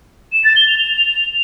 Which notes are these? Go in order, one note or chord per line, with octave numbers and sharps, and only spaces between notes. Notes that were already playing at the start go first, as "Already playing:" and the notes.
E7
A6
G7
F7
F7